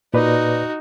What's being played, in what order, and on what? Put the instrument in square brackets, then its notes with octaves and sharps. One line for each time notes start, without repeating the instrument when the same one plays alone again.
[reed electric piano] A#2 B4 D5 [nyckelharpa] D#4 F#4